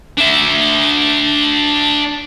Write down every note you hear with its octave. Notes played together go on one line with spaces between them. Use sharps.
D4 E5